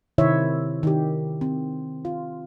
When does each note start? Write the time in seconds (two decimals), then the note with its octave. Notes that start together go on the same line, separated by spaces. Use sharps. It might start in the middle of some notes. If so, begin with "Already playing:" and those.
0.18 C3 D#3 E4 C5 C#5 E5
0.83 D#3 G4
1.41 C4
2.05 F4